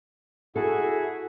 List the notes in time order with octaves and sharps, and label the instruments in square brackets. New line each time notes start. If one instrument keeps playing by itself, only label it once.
[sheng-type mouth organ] E4 F#4 G#4 [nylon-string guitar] A4